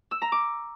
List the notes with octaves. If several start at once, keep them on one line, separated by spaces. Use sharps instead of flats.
E6
A#5
D6